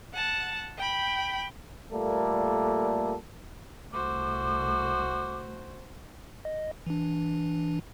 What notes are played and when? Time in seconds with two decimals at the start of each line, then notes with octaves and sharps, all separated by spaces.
0.13 F#5 A5
0.78 G5 B5
1.92 A#2 G3 A3 A#3 A4
3.93 C2 A3 F#4 C5 D6
6.45 D#5
6.86 E3 D4